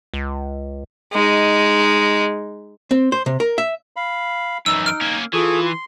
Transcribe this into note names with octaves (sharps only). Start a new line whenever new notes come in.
C#2
G#3 D#4
C4
C5
C3
A#4
E5
F5 B5
F#2 E3 D#4 E6
F6 D7
A#3 C#4
E3 F4 G#4 A4 C#6
C6